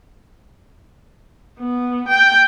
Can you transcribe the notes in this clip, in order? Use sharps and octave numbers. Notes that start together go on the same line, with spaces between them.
B3
G5